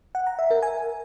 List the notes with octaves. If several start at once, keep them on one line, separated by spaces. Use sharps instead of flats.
F#5
A#5
E5
A#4
G#5